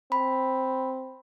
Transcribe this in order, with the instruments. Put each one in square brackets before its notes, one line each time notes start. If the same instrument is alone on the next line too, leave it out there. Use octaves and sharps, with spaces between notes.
[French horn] C4 [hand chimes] B5